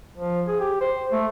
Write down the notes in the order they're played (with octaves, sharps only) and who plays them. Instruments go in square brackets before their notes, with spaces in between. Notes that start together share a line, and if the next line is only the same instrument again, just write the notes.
[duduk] F3
G#4
G4
C5
A3